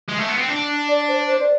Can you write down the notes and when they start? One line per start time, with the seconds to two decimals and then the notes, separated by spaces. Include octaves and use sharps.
0.09 G#3
0.19 A3
0.29 B3
0.38 C4
0.49 D4
0.88 D5
1.08 C5
1.27 C5
1.40 D5